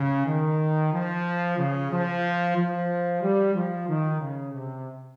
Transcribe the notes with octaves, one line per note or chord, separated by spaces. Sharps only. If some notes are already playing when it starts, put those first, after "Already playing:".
Already playing: C#3
D#3
F3
C#3
F3
F3
G3
F3
D#3
C#3
C3